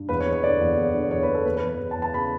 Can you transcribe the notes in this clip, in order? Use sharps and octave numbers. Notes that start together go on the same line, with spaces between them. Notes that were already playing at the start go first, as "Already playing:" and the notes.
Already playing: G2
E2 B4
C#5
E2
C#5
D3 D5
E2
E2
D3
E2 C#5
B4
E2
A4
E2 B4
B4
E2
B4
E2
A5
E2
A5
C#3 B5